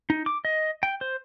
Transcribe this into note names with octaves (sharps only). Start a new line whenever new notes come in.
D#4
D6
D#5
G5
C5